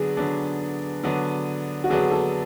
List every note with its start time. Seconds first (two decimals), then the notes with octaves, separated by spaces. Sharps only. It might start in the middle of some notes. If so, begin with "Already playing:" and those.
Already playing: D3 F#3 B3 D4 G#4
0.17 D3 F#3 B3 D4
1.04 D3 F#3 B3 D4
1.84 F#4
1.89 D3 F#3 B3 D4 G#4
2.11 A4